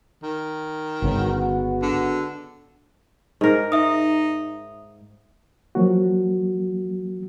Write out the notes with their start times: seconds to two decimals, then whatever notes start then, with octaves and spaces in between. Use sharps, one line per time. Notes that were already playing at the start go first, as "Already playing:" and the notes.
0.23 D#3
1.02 G1 C#3 G#3 B3 F#4
1.82 D3
3.41 G#2 A#4
3.72 D#4 E5 D#6
5.75 F3 F#3 A#3 F#4